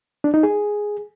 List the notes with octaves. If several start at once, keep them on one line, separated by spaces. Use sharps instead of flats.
D4
D#4
G#4